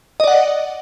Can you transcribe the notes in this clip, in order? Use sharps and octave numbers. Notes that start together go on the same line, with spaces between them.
D5 D#5 F#5